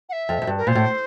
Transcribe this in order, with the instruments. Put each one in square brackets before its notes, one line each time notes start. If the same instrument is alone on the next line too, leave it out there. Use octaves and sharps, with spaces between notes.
[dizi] F#5
E5
[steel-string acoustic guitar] F2
F2
G2
[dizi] A#4
[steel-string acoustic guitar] A#2 [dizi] C5
[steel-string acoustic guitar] A2